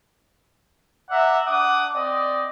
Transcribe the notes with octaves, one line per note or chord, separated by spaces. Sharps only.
D5 E5 F#5 A#5
D4 F#5 D6 D#6
C4 D5 D#5